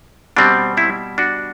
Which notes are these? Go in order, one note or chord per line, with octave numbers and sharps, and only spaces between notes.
B2 G3 C4 D4
C4 E4
D4 F#4